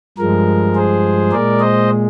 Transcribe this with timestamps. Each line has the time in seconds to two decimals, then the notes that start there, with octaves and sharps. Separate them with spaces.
0.18 G2 F3 G#3 A#4
0.75 G#4 C5
1.31 A#2 G#3 A#4 D5
1.60 C5 D#5